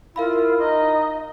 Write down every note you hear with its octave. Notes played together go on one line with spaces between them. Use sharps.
E4 F4 A#4 F5 B5
D#4 D#5